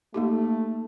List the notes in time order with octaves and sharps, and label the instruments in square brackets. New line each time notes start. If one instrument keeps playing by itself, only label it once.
[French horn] A3 [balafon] A#3 D#4 G4